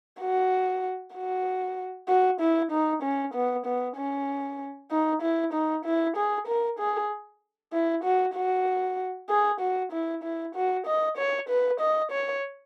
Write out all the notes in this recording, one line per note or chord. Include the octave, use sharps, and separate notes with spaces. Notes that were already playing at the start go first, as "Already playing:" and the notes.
F#4
F#4
F#4
E4
D#4
C#4
B3
B3
C#4
D#4
E4
D#4
E4
G#4
A#4
G#4
E4
F#4
F#4
G#4
F#4
E4
E4
F#4
D#5
C#5
B4
D#5
C#5